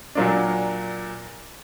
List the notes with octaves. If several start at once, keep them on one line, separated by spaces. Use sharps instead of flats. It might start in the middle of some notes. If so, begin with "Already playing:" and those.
A#2 F#3 A#3 D4